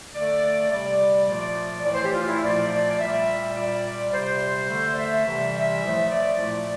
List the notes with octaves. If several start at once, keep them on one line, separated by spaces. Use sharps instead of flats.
D3 A3 D5
C3 G3 D5
A#2 F3 A3 D5
A2 E3 A3 D5
C5
G4
F4
E4
A#2 F3 A3 D5
D5
D5
A#2 G3 E5
A#2 G3 D5
C3 G3 C5
D3 A3
D5
E5
C3 E3 G3
E5
A2 F3 A3
D5
A#2 F3 A3